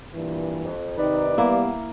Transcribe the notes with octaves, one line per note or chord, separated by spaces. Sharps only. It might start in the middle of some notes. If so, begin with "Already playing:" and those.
G2 A#2 E3
F2
C3 D#3 D#4 B4 D5
G3 A#3 B3 E4